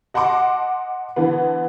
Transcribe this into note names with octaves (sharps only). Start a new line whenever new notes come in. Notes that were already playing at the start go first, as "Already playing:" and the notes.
D#5 F#5 A5 C6 D6
D3 E3 B3